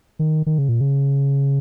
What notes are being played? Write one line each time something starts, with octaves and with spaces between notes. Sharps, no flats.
D#3
D#3
C#3
A#2
C#3